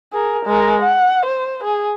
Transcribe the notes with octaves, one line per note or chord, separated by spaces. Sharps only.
G#4 A#4
G#3 A#4
F#5
C5
G#4